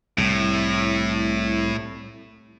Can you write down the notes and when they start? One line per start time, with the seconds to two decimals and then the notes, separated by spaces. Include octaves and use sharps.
0.18 C2 A2